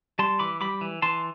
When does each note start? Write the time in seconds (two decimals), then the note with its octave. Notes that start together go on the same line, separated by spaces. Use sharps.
0.19 G3 A5 C6
0.39 E3 B5 D6
0.61 G3 B5 D6
0.81 E3
1.02 E3 A5 C6